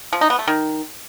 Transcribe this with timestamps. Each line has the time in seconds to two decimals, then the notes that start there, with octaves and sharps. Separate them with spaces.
0.13 F3
0.21 D#4
0.30 B3
0.39 A3
0.48 D#3